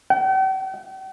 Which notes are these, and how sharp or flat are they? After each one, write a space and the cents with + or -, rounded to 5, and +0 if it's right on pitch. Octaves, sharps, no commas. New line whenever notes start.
G5 -45